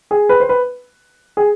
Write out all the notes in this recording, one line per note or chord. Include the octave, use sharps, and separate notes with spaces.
G#4
B4
C5
B4
G#4